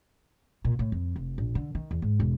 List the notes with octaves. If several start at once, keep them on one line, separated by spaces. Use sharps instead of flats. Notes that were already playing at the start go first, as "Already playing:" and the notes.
A#2
A2
F2
F1
A#1
D3
D#3
E2
G#2
E1